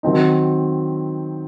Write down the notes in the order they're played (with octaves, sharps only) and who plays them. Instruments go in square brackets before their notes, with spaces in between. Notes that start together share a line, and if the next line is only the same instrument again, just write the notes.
[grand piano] D#3 F#3 C4 D#4